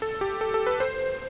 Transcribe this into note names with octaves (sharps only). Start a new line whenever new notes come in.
A4
G4
A4
A4
B4
C5